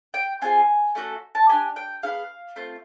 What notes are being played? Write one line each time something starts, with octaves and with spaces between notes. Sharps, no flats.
G5
C4 F4 G#4 G#5
A3 C#4 F#4 A4
A5
D4 G4 G#5
G5
B3 D#4 G#4 F5
A3 C4 F4